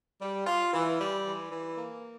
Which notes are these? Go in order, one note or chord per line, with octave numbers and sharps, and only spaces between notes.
G3
F4
E3
G3
E3
E3
A#3